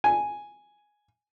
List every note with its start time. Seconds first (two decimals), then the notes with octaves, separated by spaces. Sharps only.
0.04 G#5